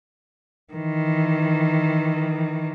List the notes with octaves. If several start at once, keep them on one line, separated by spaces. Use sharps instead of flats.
D#3 E3